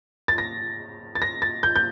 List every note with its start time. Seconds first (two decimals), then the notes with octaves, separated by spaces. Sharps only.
0.28 A6
0.38 A#6
1.15 A6
1.22 A#6
1.42 A6
1.63 G6
1.76 G6